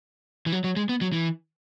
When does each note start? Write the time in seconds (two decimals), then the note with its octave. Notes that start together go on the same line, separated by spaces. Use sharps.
0.46 E3
0.52 F#3
0.64 F#3
0.77 G#3
0.89 B3
1.01 F#3
1.13 E3